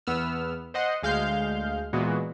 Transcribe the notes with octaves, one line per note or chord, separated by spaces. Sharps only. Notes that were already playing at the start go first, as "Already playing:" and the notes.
E2 B3 E6 F6
C5 D#5 F#5 C6
D2 G#3 F5 F6 G6
A#2 E3 G#3 B3 F#4